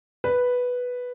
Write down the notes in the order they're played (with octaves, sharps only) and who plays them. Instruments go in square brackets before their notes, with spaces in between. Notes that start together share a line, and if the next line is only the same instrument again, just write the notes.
[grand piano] B4